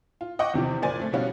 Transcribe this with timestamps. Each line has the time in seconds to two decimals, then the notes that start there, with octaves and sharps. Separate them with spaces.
0.21 F4
0.39 D#5 F#5 G5 C#6 D6
0.54 E2 C3 D#3 F3
0.82 F#1 A#2 C5 D5 G#5 A6
1.00 A3 C4
1.13 B2 F3 G3 C#4 F4 F#4